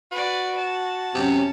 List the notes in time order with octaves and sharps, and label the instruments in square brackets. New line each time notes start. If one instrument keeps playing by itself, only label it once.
[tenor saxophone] F#4 [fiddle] B4 D5
[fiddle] A5
[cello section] F#2 C#4 [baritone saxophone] C3